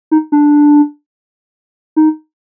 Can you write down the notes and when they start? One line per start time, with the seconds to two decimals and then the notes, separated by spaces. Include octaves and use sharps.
0.11 D#4
0.32 D4
1.96 D#4